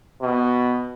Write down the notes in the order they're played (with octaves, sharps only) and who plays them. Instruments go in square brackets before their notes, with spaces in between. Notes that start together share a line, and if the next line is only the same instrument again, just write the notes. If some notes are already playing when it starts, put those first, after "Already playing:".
[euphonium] B2